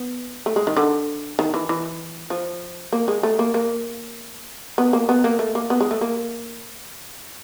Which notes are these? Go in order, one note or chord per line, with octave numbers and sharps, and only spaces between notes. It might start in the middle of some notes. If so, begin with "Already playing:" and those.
Already playing: B3
A3
G#3
D#3
D3
D#3
E3
E3
F3
A#3
G#3
A3
A#3
A#3
B3
A#3
B3
A#3
A3
A#3
B3
G#3
A3
A#3